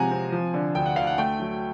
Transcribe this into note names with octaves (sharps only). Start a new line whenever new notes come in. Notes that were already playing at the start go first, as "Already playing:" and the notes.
Already playing: C3 F3 G#3 F#5 G#5 A#5
C4
F3
D3
D2 G5
F#5
D2 F5
F#5
A3 G5
F#3